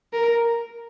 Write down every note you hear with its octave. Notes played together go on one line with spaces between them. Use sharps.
A#4